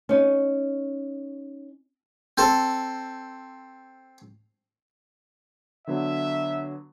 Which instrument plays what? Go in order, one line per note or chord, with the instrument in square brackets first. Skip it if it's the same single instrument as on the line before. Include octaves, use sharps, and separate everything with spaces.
[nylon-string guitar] C#4 D#4
[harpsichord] C4 A4
[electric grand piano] D3 F#3 B3 [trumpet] E5